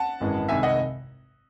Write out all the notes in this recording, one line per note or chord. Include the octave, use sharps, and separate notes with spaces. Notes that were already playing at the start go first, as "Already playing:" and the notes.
Already playing: F#5 A5
G#1 F#2 E3 G#3
C2 C3 D#3 G#3 E5 G#5
D#5 F#5